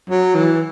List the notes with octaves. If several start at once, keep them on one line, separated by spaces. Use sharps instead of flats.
F#3
E3